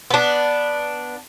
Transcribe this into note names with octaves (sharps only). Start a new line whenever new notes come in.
B3 D4